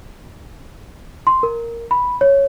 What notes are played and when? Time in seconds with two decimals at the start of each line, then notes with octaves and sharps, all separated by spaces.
1.27 C6
1.43 A#4
1.91 B5
2.21 C#5